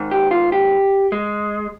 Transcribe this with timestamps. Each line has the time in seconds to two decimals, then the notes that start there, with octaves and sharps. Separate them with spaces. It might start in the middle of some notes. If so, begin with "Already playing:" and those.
Already playing: G#2 D#3
0.11 G4
0.31 F4
0.52 G4
1.12 G#3